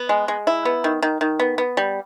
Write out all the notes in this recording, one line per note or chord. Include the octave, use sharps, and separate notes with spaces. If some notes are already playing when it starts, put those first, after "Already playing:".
Already playing: B3
G#3
G#3
E4
B3
D#3
D#3
D#3
B3
B3
G3